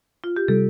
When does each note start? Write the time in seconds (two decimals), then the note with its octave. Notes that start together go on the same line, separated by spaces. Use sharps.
0.24 F4
0.36 G4
0.48 C3 G3 A4